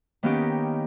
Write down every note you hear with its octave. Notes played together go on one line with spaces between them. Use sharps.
D#3 A#3 B3 C#4 D#4 G4